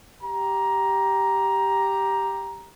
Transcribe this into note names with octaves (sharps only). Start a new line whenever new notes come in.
G4 A#5